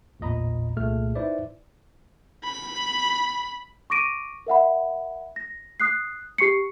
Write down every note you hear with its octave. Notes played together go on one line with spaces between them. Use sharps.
A1 E2 A#2 D#5 A#5 B5
C2 A#2 A3 A#3 G#4 F6
D#4 E4 B4 C5 D5 E5
B5
C#6 D6 A#6 D7 D#7
A#4 E5 F#5 B5
A#6
D#6 F#6 C7
G4 C#6 C7 C#7